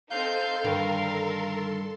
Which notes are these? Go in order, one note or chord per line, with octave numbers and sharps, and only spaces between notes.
C4 D#4 A4 F5 C6 G6
G2 D3 D#3 A#4